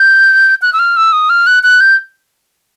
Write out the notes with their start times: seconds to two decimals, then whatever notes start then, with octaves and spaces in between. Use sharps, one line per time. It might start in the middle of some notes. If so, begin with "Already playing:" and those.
Already playing: G6
0.62 F#6
0.73 E6
0.79 F6
0.97 E6
1.13 D#6
1.30 F6
1.47 F#6
1.63 F#6
1.80 G6